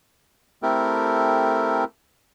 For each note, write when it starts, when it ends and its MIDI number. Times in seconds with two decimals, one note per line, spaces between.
0.63 1.84 57
0.63 1.84 60
0.63 1.84 64
0.63 1.84 67
0.63 1.84 69
0.63 1.84 70